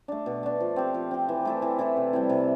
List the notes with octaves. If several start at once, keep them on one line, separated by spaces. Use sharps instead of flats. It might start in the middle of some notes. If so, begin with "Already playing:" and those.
A3 D4
B2
A3 D4
F3
C4 G4
F3
C4 G4
E3
A3 E4 A4
E3
A3 E4 A4
C3
G3 C4 E4
C3